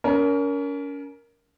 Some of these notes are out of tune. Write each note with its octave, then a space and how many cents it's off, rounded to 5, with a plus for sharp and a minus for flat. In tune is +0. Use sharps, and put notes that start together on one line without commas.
C#4 +35 A#4 +0